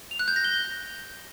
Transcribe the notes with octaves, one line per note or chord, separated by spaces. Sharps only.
F7
F#6
G6
A#6
G7